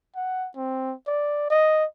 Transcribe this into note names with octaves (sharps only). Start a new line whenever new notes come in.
F#5
C4
D5
D#5